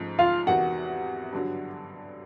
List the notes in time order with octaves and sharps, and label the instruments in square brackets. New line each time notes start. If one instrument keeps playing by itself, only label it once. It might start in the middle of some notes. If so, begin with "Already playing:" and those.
Already playing: [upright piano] G#2 F3 A3 C#4
[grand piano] F4 F5
[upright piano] E2 C3 D#3 [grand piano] F#4 F#5
[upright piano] G2 D3 F#3